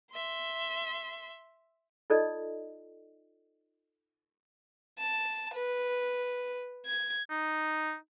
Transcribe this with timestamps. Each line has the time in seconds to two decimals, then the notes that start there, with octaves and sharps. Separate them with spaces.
0.12 E5 C6
2.10 D#4 F4 A4 D5 D#5
4.99 A5
5.54 B4
6.86 G#6
7.30 D#4